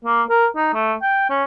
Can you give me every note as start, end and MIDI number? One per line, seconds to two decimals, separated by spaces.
0.05 0.23 58
0.30 0.47 70
0.56 0.73 63
0.74 0.95 57
1.02 1.27 79
1.30 1.44 61